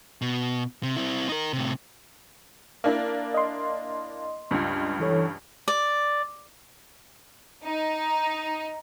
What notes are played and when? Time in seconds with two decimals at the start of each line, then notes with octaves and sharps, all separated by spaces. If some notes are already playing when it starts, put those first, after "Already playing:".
0.22 B2
0.83 C3
0.96 C4 E4
1.29 D#4 A#4
1.53 A2 C3
2.84 A#3 D4 E4
3.34 D#5 C6
4.51 C#2 G2
5.00 E3 A4 C#5
5.68 D5
7.66 D#4